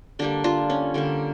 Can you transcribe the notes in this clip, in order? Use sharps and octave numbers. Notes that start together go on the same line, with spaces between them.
D3 G3 A#3 D4
D4 F4
C#4
D3 G3 A#3